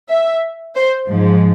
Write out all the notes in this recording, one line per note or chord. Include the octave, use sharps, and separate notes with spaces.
E5
C5
G#2 F3 G#3